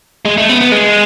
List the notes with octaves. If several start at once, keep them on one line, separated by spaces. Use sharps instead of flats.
G#3
A3
B3
B3
G#3